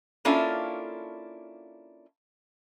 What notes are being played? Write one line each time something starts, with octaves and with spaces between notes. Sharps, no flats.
A#3 C#4 D4 E4 F4 A4